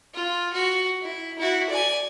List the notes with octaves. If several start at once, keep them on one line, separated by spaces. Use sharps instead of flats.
F4
F#4
E4
E4 F#4
D5 G#5